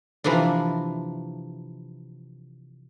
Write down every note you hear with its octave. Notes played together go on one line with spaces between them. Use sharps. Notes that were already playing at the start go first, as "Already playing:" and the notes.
C3 E3 F3 A#3 D4